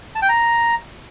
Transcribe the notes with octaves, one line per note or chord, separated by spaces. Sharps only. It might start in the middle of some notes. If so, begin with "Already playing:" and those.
A5
G5
A#5